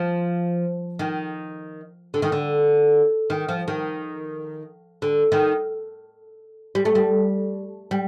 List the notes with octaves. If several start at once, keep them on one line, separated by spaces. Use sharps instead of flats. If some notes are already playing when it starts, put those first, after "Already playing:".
Already playing: F3
D#3
D3
D#3
D3
D#3
F3
D#3
D3
D#3
G3
A3
G3
G3